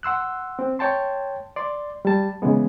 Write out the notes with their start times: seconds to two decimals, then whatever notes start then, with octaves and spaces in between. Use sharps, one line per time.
0.03 F#5 C6 E6 F#6
0.59 C4
0.79 C#5 G5 A5 C6
1.56 D5 C6
2.05 G3 A5
2.42 C#3 E3 G#3 B3